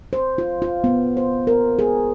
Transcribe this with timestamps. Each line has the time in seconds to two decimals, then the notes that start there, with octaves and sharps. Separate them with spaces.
0.13 C5
0.38 F4
0.62 F4
0.84 B3
1.17 C5
1.47 A#4
1.79 G#4